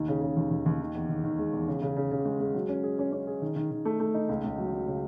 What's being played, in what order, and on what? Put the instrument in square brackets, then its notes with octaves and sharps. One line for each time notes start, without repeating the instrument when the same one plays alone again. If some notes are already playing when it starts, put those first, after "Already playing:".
Already playing: [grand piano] D#2 D#3
C#3
C#3
D#2
D#2
D#2
D#3
E2
D#3
D#3
G#3
E2
C#3
C#3
C#3
C#3
G#3
G#3
F#3
C#4
G#4
C#4
C#4
G#4
D#3
D#3
D#3
A3
A3
D#4
C#2
C#2
F#3
F#3
C#3